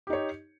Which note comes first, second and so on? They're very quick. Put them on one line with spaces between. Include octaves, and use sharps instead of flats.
G4 D#4 C#5